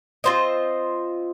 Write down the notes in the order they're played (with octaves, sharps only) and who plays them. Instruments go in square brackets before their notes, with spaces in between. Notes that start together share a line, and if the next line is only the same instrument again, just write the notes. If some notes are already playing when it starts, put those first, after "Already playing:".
[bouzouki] C4 F4 C5 D#5